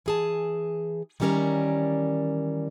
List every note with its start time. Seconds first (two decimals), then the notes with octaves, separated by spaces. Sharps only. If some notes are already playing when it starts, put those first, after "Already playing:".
0.06 E3 G#4 A5
1.20 D#3 E3 G3 C#4 A#4 D5